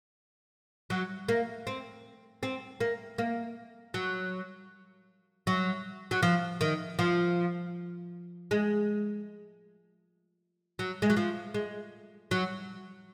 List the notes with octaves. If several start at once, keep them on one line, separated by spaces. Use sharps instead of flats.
F#3
A#3
C4
C4
A#3
A#3
F#3
F#3
F#3
F3
D#3
F3
G#3
F#3
G#3
F#3
F3
G#3
F#3